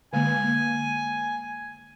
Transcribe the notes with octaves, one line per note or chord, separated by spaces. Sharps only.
D3 G#3 A#3 G#5